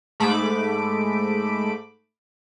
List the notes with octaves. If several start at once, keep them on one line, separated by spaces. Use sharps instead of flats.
G#2 A3 B5 D6